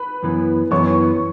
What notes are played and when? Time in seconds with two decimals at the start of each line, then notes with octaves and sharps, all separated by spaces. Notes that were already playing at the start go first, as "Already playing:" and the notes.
Already playing: B4 B5
0.23 F#2 E3 B3
0.71 F#2 E3 B3 C#5 C#6